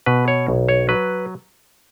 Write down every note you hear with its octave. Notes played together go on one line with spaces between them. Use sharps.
B2 B4
C#5
B1
C#5
F#3 B4